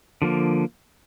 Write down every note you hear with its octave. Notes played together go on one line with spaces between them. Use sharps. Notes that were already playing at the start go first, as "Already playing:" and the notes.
D3 F3 A#3